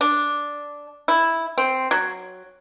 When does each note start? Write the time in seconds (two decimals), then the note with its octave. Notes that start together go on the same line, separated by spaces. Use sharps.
0.01 D4
1.08 E4
1.58 C4
1.91 F#3